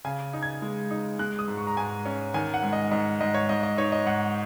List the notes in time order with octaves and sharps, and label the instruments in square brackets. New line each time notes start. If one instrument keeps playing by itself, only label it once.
[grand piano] C#3 G#5
D#4
G#6
G#3
D#4
G#3 F#6
D#6
G#2
C#6
A#5
G#2 G#5
C#4
D#3 G#5
F#5
G#2
D#5
G#2 D#5
G#2 D#5
C#5
G#2 D#5
D#5
D#4 C#5
D#5
G#2 F#5